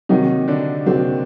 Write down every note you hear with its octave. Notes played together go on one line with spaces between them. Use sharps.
C3 D#3 F#3 A#3 D#4 F#4
D3 D4
C3 F#3 A#3 C4 F#4